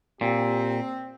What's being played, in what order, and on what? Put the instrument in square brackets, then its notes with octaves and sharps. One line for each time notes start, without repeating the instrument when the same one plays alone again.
[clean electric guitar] A#2 [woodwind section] C4 [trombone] G4